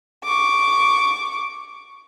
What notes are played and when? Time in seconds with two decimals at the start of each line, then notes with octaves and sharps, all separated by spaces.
0.24 C#6 D6